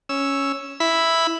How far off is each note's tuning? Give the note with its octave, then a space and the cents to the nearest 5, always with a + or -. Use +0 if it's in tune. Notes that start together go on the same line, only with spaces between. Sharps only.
C#4 +0 E6 +0
E4 +0 B5 +0